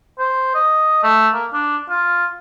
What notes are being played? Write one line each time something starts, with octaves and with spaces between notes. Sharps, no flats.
C5
D#5
A3
A#3
D4
F4